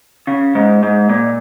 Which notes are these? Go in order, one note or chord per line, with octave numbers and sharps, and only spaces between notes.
C#3
G#2
G#2
A#2